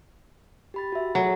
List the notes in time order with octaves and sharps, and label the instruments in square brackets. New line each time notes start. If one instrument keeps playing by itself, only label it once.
[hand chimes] G4 B5 A6
F#4 E5
[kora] F#3 [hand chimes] G#4 A4